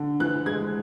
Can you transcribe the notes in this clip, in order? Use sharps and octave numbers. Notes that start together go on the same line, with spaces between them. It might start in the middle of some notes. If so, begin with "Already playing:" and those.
Already playing: D3
E3 F#6
G#3 G#6